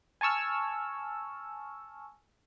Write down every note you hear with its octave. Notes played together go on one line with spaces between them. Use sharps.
G#5 A5 C#6 E6 F6